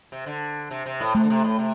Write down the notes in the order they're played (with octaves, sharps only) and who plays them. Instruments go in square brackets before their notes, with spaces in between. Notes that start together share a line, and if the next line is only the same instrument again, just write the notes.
[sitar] C3
D3
C3
C3
A2
[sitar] C3 [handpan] A3
[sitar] D3
C3
A2
C3